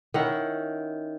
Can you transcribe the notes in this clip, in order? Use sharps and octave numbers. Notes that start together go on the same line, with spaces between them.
D#3 C#4 E4 F#5